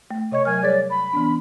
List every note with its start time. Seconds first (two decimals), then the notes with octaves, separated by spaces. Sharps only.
0.11 A3
0.32 C3 C#5 D#5 G#6
0.45 F#3 A#4 G#5 F6
0.61 G3 G#4 C#5 D5
0.89 B5
1.13 E3 B3 D4